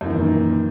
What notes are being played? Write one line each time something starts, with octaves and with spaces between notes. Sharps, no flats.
F#2 A#2 D#3 E3 A#3